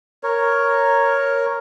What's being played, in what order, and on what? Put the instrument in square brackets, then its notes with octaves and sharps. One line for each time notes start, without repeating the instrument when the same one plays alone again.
[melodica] A#4 C#5